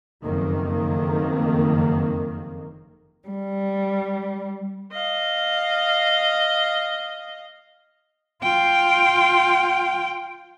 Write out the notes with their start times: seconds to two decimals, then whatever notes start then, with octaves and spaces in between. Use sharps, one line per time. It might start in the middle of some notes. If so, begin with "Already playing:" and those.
0.24 F#1 F2 D#3 A#3
3.28 G3
4.92 D#5 F5
8.43 F4 G5